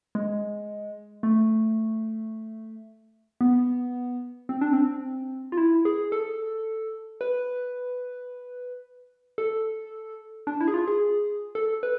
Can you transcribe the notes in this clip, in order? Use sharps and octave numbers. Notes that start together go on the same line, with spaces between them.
G#3
A3
B3
C4
D4
C4
F4
E4
G#4
A4
B4
A4
D4
E4
G#4
F4
G#4
A4
B4